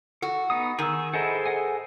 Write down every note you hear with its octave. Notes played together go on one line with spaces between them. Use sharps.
F#4 A4
B3 D#4 D#6
D#3 G#4 E6
E4 G#4 A4 C5 D#5 F#5
D#5 F#5 G#5